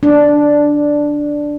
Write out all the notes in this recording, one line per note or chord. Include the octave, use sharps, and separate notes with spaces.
D4